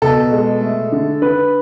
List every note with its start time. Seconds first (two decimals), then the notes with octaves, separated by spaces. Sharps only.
0.02 B2 A4
0.32 G#3
0.61 A3
0.92 D3
1.22 D3 B4